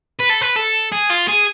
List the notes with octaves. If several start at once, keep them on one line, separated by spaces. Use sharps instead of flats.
B4
A4
B4
A4
G#4
F4
G#4